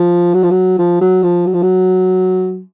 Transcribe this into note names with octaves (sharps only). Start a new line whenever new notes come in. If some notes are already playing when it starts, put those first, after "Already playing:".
Already playing: F3
F#3
F3
F#3
F3
F#3
F3
F#3
F3
F#3